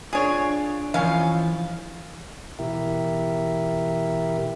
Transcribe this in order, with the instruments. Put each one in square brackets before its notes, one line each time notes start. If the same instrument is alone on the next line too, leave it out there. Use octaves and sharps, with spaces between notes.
[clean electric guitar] D4 F4 [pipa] G#4 C#5
[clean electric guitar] E3 F3 [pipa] C#4 F5
[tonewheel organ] B2 E3 E4 G4 A#4 E5